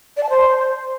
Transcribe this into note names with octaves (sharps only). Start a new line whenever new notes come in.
D5
A5
C5